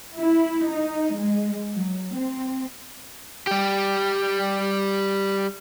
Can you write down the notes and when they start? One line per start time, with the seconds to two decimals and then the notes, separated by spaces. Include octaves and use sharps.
0.18 E4
0.71 D#4
1.16 G#3
1.74 F#3
2.13 C4
3.47 G3 G4